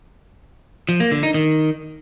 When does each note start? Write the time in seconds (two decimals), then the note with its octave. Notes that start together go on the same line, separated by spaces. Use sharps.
0.89 F3
1.00 A#3
1.11 D3
1.23 D#4
1.34 D#3